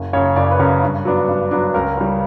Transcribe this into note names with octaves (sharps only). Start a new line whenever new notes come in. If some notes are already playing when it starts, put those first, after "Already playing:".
Already playing: F#1
F#2 C#3 C#5
F#1 D5
B4
F#2 C#3
G2
F#3 B3 D4
G2
F#3 B3 D4
C#2 A#4
C#3 G3